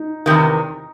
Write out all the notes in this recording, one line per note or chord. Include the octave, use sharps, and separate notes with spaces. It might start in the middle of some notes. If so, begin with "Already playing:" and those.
Already playing: D#4
E2 C3 D#3